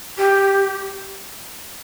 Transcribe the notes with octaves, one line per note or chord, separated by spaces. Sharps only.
G4